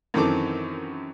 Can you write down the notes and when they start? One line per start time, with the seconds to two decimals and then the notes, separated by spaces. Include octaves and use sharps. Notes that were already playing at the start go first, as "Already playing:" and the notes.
0.14 F#2 D#3 E3 C4 A4 D6